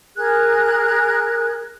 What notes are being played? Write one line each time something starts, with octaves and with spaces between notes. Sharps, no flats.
G#4 A#4 F#6 G#6